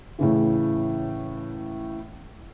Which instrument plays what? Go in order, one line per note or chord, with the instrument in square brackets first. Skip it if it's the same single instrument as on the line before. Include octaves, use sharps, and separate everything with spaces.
[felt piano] A2 C#3 E3